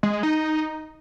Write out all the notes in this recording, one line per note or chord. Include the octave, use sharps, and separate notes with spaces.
G#3
G#3
D#4